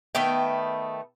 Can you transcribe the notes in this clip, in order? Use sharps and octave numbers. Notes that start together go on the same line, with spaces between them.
D#3 A3 B3 G5